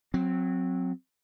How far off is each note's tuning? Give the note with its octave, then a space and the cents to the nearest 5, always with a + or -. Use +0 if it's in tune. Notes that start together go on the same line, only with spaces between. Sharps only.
F#3 -20 C4 +0